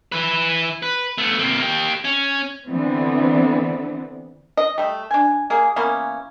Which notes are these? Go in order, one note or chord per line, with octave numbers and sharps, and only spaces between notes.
E3 B4
B4
A3 B3
C3 A#3
A#3 G4
C#4
D3 E3 B3 C4
D#5
G3 A3
D4 G#5
A#3 G#4
E3 A#3 B3 C#4